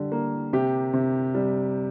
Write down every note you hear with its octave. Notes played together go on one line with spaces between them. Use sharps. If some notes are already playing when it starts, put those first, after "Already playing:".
Already playing: D3 G3
A#3
C3 G4
C3
G3